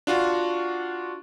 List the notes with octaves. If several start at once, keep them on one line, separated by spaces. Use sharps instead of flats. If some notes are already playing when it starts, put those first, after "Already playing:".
D4 F4 F#4